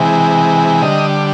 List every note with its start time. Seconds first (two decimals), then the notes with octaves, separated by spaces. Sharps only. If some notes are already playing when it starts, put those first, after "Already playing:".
Already playing: C3 E3 G#3
0.82 D3 G3 D#5